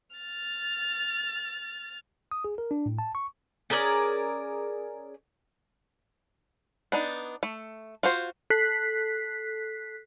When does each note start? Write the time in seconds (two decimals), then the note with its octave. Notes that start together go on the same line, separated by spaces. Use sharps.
0.16 F6 A6
2.31 D#6
2.44 G#4
2.58 A#4
2.71 D4
2.86 A2
2.99 A5
3.15 C#6
3.70 C#4 G#4 A#4 D5
6.92 B3 D4 D#4
7.43 A3
8.03 F4 F#4 C5
8.50 A4 F#6 B6 C7